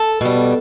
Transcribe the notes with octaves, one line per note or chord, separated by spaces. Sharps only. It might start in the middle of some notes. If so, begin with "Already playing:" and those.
Already playing: A4
B2 G3